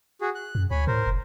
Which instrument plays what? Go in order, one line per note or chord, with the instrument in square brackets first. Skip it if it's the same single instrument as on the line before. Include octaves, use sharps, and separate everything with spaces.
[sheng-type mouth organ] F#4 G#4
F#6
[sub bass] F#2
[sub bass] D2 [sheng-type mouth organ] C#5 G#5 B5
[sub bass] A2 [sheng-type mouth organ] A#4 C5
[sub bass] F1